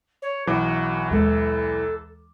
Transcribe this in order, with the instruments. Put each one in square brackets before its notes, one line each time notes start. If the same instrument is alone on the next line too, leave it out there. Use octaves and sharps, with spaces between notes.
[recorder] C#5
[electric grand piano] B1 E3 D6 [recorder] F#4
[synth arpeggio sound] D#2 G#3 [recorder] A4